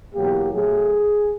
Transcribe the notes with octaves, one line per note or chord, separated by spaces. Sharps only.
E2 B2 F#3 A#3 G4
A2 F#3 A3 G#4